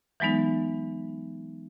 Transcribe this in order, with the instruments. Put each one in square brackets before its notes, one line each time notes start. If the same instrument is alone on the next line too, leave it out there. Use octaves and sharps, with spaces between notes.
[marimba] E3 F#3 G#3 B3 D#4